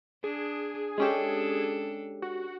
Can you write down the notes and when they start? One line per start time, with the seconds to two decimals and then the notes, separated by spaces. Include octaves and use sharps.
0.24 D4 G#4
0.98 G#3 C#4 D4 G4 A4
2.22 F#4